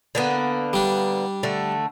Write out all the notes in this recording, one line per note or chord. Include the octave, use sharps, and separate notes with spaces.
D3 A#3 B3
G3 D4
D3 A3